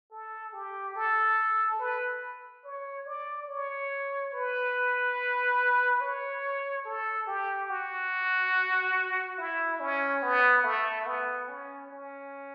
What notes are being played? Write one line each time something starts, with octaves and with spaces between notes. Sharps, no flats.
A4
G4
A4
B4
C#5
D5
C#5
B4
C#5
A4
G4
F#4
E4
C#4
B3
A3
B3
C#4
C#4